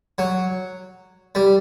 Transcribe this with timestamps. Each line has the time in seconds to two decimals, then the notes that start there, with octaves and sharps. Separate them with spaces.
0.18 F#3
1.35 G3